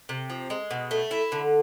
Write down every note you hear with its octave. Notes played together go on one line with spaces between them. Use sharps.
C3
F3
G#3
B2
A3
E4
D3